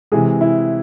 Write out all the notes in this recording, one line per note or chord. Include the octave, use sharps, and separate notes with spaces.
C3 E3 G#3 G#4
E4